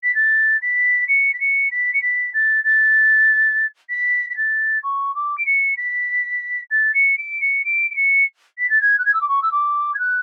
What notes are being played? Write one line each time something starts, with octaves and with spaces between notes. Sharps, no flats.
B6
A6
B6
C#7
B6
C#7
B6
C#7
B6
A6
A6
B6
B6
A6
C#6
D6
D7
C#7
B6
A6
C#7
D7
C#7
D7
D7
C#7
B6
A6
G#6
F#6
G#6
E6
D6
C#6
E6
D6
G#6
F#6